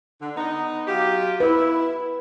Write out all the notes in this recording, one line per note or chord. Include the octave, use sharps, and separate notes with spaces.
D3
B3 D#4
F#3 F4 G4
E4 B4